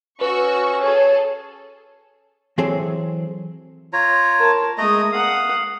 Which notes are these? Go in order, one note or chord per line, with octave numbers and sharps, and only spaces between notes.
C#4 F#4 B4 C#6 E6
G#4 A4 C#5
E3 F#3 C4 G#4 A4
F4 C#5 A#5
A#4 A5
G#3 A3 D#5 A#5 D#6
F5 F#5 D#6